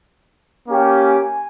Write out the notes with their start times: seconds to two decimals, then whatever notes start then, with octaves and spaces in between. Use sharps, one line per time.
0.68 A#3 C#4 G4
1.04 G#5